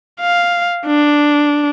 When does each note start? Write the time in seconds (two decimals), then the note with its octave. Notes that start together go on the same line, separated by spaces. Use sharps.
0.20 F5
0.87 D4